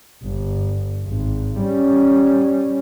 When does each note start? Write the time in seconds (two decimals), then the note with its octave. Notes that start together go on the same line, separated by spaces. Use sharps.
0.24 G1
1.06 G#1
1.61 G3 C#4